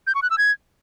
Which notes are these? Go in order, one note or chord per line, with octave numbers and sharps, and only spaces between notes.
G6
C#6
F#6
E6
G#6